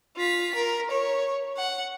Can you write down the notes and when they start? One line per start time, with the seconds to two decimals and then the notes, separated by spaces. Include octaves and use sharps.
0.16 F4 B6
0.55 A#4
0.91 C#5
1.57 F#5